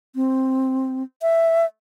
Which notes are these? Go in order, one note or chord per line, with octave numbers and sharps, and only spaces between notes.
C4
E5